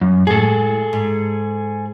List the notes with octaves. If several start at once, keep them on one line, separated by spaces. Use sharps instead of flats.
F#2
A2 G#3 G#4 A4
G#2